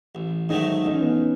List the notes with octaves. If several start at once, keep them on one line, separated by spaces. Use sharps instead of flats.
A1
G#2 D#3 F#3 A3 D#4
A1 D#4
C#4
B3
C#4